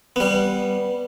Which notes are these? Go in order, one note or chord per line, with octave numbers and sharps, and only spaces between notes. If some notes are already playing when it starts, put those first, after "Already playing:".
G3 B3